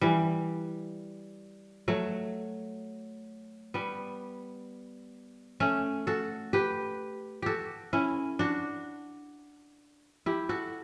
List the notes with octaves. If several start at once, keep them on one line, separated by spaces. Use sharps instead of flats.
E3 G3
F#3 A3
G3 B3
A3 C#4
F#4 A4
G4 B4
F#4 G4 A4
C#4 E4
D4 F#4
E4 G4
F#4 A4